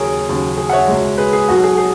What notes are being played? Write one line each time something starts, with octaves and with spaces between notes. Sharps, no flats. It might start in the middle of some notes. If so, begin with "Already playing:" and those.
Already playing: D#2 C#3 F#3 G#4 A#4 C#5
D#2 C#3 F#3
G#4
F#5
C#5 E5
C#2 B2 G#3
G#4 B4
G#4
B1 B2 F#3 F#4
G#4
G#4